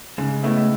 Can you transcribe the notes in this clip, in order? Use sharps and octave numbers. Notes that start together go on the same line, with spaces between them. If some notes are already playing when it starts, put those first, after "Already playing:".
G#2 C#3
A2 G#3 B3 E4